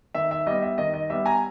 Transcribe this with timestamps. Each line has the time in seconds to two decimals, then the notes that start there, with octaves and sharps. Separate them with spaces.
0.14 D#3 E5
0.31 E5
0.47 G3 B3 D#5
0.62 E5
0.78 D#3 D#5
0.94 D#5
1.10 G3 B3 E5
1.26 G#5 A#5